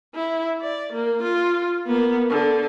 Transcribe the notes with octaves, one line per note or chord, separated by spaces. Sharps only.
E4
D5
A#3
F4
A#3 B3
D3